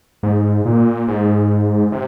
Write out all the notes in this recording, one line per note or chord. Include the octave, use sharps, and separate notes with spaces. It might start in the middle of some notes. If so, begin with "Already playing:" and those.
G#2
A#2
G#2
C3